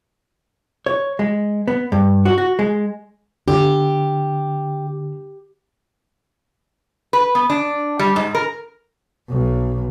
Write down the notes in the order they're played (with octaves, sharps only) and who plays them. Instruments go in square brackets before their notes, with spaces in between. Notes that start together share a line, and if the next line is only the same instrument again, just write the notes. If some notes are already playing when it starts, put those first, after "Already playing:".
[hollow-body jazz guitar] C#5
G#3
B3
G2
F#4
F#4
G#3
[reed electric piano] D3 [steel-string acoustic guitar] G4
[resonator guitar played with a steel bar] B4
B3
D4
G3
G#2
A#4
[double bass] B1